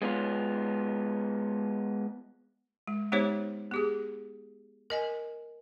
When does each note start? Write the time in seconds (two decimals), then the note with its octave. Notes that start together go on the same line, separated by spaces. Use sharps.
0.02 G#3 B3 F4
2.87 G#3
3.12 G#3 B3 D#4 G4 C5 C#5
3.71 B3 G4 G#4
4.90 A#4 D#5 G#5